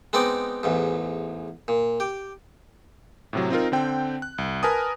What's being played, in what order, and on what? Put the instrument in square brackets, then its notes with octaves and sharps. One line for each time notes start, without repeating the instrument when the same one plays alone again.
[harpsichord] G#3 B3 C4 D#4 B4 D5
A1 E2 G#2
A#2
G4
[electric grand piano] A2 C3 F#3
C4 D#4 F4 A#4
D3 C4 G5
F#6
C2
A#4 B4 G#5 A5 D#6